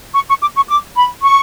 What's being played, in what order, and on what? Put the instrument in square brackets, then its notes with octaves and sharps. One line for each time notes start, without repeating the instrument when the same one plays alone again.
[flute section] C#6
C#6
D6
C#6
D6
B5
C#6